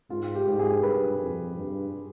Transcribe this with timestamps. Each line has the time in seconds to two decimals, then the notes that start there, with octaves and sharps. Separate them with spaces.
0.10 G#2 F4
0.35 G4
0.46 G#2
0.59 G#4
0.83 G2 B4
1.19 F2
1.56 G2